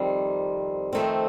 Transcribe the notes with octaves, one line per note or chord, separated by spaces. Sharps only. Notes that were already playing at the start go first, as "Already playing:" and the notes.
Already playing: F2 D#3 G3 C4
F2 D#3 A3 C4